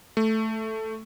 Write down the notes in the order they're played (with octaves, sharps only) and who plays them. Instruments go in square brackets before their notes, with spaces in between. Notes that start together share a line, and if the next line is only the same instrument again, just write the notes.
[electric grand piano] A3